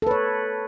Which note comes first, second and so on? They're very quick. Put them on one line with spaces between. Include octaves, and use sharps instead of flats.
A4 B4 C#5